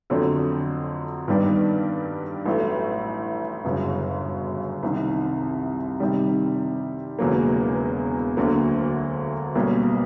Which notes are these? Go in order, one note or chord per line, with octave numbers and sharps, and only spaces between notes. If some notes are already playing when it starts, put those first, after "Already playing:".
F2 D3 F#3 A3 C4
G2 D#3 G3 B3 D4
A1 A2 F#3 A3
G1 F#2 C#3
C2 C3 D#3
C3 D#3 G3
E1 E2 C#3 F#3 A#3
D2 D3 F#3 A#3
B1 B2 G3 A#3 C#4